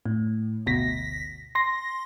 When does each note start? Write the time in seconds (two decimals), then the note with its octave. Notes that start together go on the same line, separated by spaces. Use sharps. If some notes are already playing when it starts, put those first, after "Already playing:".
0.06 A2
0.66 G1 D2 B2 A#6 B6
1.55 C6 A#6